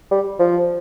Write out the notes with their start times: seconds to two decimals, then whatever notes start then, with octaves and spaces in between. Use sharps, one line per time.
0.11 G3
0.39 F3